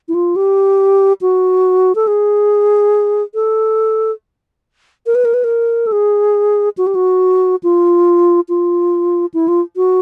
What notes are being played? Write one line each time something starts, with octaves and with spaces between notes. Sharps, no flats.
E4
F4
G4
F#4
A4
G#4
A4
A#4
B4
A#4
B4
A#4
A4
G#4
F#4
G4
F#4
F4
F4
E4
F4
F#4